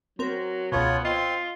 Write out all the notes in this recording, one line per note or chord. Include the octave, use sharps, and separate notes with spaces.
F#3 C4 A#4
C#2 B2 B3 F4 C#5
C4 F4 D#5 C6